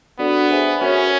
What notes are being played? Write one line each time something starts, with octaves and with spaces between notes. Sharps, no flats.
B3 D4 F#4 A4 D5
G#4 C5 E5 G#5
C#4 F#4 A#4 C#5 E5